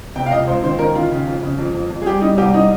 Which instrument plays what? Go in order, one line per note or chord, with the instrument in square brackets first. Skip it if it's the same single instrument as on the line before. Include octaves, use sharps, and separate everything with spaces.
[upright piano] C3 G5
F5
C#2 D#5
C#2 C5
D#3 C5
D#3 A#4
D#3 F4
C#3
F2
C#3
F2
F2
F2
G#4
G3 G4
G3 D#4
C2 G4
G3 D#4